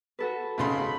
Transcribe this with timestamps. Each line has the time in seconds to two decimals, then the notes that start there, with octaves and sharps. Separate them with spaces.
0.19 F#4 A4 B4
0.58 G#1 C#3 B5 C6